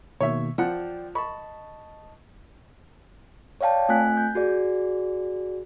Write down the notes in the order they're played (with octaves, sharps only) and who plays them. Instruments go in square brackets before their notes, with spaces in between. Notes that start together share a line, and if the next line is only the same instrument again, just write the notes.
[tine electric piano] B2 D#3 A#3 [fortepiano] C#5 E5
[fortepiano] F3 F#5 [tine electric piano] D5 G5
[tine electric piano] D#5 A5 [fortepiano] B5 C#6
[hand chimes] C#5 D5 F5 G5 A5
A3 C4 F4 G#5 F#6 B6
G6
F#4 G#4 D5